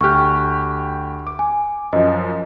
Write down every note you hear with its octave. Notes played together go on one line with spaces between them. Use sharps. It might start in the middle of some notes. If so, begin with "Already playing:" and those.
D2 G4 C#6 F6 F#6
D6
G#5
F#2 F3 D#5